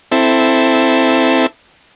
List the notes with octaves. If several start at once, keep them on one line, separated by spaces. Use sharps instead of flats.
C4 E4 A4